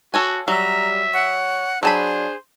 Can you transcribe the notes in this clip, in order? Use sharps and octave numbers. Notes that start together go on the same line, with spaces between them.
F#4 A4 C#5 G#5
F#3 G3 E5 A#5
C#5 F#5
F#3 D4 G#4 C5 A5 B5